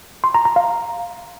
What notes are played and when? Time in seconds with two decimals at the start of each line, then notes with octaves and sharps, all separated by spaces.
0.24 C6
0.34 A#5
0.45 A#5
0.56 F5